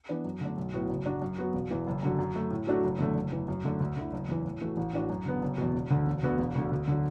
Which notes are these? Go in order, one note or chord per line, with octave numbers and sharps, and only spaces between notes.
E3 B3 D4
F#2
D3 A3 D4
B1
A2 F#3 B3 F#4
F#1
F#2 F#3 D4 F#4
F#2
F#3 B3 F#4
E1
E2 E3
F#1
F#2 D3 F#3
F#2
F#3 A3
A2
F#3 A3 D4 F#4
F#1
E2 D3 A3
F#1
E2 E3
F#2
D3 A3 D4
D2
D3 A3 E4
F#1
E2 E3
A2
E3 A3 F#4
A1
A2 E3 D4 F#4
F#2
D3 B3
F#1
E2 B2
E1
D2 D3
E1
D2 D3 B3 F#4
E1
D2 D3
D2
D3 F#3